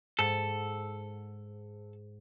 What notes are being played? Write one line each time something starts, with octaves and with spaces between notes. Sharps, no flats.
G#2 A4